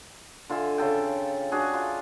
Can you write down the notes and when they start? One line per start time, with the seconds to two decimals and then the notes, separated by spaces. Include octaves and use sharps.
0.49 D3 F4 E5 G#5
0.78 C#3 A4 G5
1.52 D4 F#4 G#4
1.74 F4